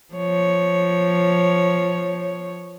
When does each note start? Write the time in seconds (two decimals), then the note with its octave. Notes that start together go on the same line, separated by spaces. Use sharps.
0.15 F3 C#5